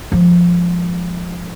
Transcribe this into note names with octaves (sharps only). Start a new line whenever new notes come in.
F3 G#3